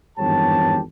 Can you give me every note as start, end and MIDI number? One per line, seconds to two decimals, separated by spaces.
0.18 0.79 32
0.18 0.79 40
0.18 0.79 43
0.18 0.79 67
0.18 0.79 73
0.18 0.79 81